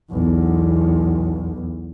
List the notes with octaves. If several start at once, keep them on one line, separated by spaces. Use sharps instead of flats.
B1 E2